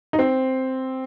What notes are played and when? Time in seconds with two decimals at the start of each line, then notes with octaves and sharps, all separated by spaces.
0.13 D#4
0.19 C4